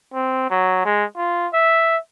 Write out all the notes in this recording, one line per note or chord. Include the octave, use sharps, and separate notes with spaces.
C4
F#3
G#3
F4
E5